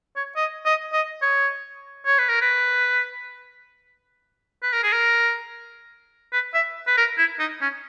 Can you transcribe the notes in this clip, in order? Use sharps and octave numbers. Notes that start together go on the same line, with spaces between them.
C#5
D#5
D#5
D#5
C#5
C#5
B4
A#4
B4
B4
A#4
G#4
A#4
B4
E5
B4
A#4
E4
D#4
C#4